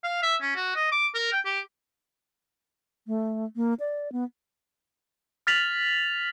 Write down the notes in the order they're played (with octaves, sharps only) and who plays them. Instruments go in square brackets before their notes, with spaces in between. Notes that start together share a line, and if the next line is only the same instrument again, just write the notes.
[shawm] F5
E5
C#4
F#4
D#5
D6
A#4
G5
G4
[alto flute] A3
A#3
D5
B3
[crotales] F6 A6 B6 F7 F#7